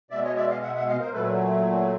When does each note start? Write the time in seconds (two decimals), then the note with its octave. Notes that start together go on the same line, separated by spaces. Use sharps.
0.10 B2 G#3 D5 E5
0.23 C#5 D#5
0.36 D5 E5
0.49 D#5 F5
0.62 E5 F#5
0.75 E5 F#5
0.88 D#5 F5
1.00 A#4 C5
1.13 A#2 F#3 A3 A4 B4